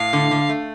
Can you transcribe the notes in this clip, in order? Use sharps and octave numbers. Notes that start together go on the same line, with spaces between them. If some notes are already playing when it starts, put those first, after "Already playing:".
Already playing: A2 F5
D3
D3
A3